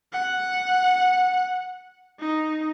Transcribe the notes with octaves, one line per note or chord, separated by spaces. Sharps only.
F#5
D#4